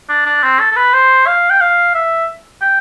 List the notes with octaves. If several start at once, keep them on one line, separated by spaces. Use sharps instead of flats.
D4
D4
C4
A4
A4
B4
C5
F5
G5
F5
E5
G5